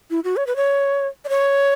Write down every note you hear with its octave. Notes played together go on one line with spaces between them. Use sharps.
E4
F#4
C#5
B4
C#5
D5
C#5